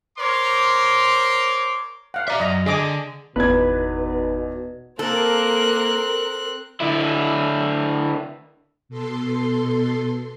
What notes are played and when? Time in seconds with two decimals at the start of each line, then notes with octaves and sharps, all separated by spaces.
0.18 A#4 C5 C#5 C6 D6
2.14 F5 F#5
2.28 D5 E5 A#5
2.40 F#2 D#5 A#5
2.66 D3 G#4 D#5 D6
3.36 G1 E2 B2 D#4 B4 G#6
4.99 A#3 C4 A4 A#4 F#6
6.80 D3 E4
8.89 B2 A4 C6